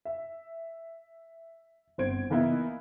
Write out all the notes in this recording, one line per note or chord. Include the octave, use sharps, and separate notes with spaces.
E5
G1 C4 C5 G#6 D7
E3 A#3 B3 D#4 E4